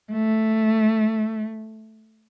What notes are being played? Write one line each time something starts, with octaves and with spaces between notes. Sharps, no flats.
A3